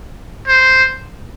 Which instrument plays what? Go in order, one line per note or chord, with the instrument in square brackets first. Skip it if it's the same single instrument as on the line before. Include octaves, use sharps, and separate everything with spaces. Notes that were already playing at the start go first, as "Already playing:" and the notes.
[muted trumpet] C5